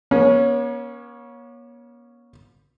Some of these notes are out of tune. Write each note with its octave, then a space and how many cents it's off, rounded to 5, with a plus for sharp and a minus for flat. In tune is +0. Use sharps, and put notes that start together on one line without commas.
A#3 +45 C#4 +0